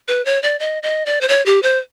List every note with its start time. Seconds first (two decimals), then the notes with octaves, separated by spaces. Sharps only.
0.08 B4
0.25 C#5
0.43 D5
0.60 D#5
0.83 D#5
1.06 D5
1.21 C5
1.28 C#5
1.46 G4
1.63 C5